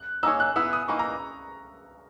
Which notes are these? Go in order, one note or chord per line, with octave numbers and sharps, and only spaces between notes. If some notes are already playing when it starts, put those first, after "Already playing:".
Already playing: F#6
A#3 D#4 G#4 C#5 E6
F#6
B3 E4 G#4 E6
D#6
E3 A#3 D#4 C#6
A#5